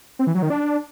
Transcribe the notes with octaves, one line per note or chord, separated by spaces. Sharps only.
C4
E3
F#3
D#3
D4